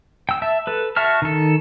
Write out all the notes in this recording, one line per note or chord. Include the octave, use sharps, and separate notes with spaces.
G5 E6
E5 A5
A4 B4
F#4 E5 A5 C#6 F6
D#3 A4